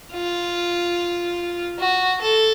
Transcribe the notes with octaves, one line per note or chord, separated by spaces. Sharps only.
F4
F#4
A4